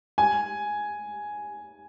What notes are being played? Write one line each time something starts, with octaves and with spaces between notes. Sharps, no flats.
G#5